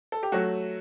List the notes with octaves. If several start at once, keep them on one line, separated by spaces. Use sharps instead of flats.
A4
G4
F#3 A3 F#4